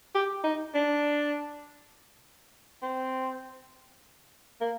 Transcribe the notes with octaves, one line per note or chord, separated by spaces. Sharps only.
G4
D#4
D4
C4
A#3